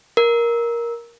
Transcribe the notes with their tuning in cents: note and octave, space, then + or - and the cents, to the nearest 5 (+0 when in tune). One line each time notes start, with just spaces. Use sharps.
A#4 +10